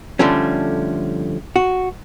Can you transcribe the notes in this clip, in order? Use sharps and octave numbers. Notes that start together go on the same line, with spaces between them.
D3 F3 G3 A3 C#4
F#4